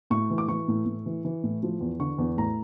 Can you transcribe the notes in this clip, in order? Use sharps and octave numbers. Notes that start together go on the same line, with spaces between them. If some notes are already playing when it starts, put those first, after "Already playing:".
A2 C#6
E3
D6
E3 C#6
A2
A2
E3
E3
A2
F3
E2
D3 C#6
E2
A2 A#5